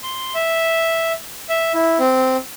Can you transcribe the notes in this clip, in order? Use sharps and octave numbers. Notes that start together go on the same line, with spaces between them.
C6
E5
E5
E4
C4